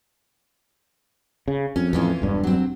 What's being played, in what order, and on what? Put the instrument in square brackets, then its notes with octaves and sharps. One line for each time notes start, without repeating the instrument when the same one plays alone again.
[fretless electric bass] C#3
[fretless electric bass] F2 [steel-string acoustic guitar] C#4
[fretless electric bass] F2 A2 [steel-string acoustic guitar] E3 C#4 F4
[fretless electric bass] E1 G2 D4
[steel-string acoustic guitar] F#3 C4